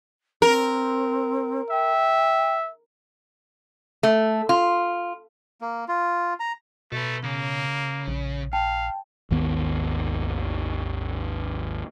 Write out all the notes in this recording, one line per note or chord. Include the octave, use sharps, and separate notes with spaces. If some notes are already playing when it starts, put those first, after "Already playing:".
C4 A#4
E5 G5
A3
F4
A#3
F4
A#5
B2 A3 A4 B4
C#3 A#3
A#1
F5 G5 A5
G#1 D#2 D#3 B3